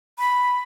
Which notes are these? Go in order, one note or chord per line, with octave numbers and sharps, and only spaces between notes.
B5